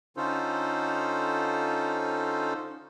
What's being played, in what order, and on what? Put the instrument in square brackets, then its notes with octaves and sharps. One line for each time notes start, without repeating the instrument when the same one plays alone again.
[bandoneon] D3 C#4 D#4 F4 A4 C5